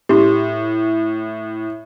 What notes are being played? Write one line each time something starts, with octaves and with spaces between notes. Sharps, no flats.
A2 G4 C6